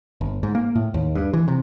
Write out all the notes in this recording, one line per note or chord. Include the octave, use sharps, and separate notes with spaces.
G1
G#2
A#3
A2
D#2
G2
E3
C3